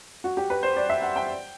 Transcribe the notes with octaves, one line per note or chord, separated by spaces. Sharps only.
F#4
G4
B4
C5
D5
E5
F#5
G5